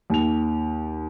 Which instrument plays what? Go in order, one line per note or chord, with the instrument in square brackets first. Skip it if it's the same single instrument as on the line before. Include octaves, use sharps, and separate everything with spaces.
[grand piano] D#2 F7